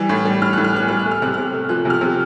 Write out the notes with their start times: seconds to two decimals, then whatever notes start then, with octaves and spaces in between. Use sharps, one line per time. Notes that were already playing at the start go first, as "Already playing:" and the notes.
Already playing: E3 G3
0.09 A2
0.25 G3
0.42 A2 F6
0.53 A2 F#6
0.64 F6
0.74 E3 F#6
0.88 G3 F6
0.99 F#6
1.05 A3
1.11 F6
1.22 C3 F#6
1.34 C3 F6
1.54 A3
1.69 F3 F#6
1.85 C3
1.90 F6
2.01 C3